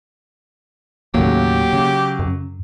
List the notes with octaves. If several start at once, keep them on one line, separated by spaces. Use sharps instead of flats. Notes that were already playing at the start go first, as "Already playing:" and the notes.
D#2 A2 C#3 F#3 A#3 G4
C#3
F#2